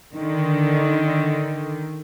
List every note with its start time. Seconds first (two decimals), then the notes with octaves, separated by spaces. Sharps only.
0.15 D3 D#3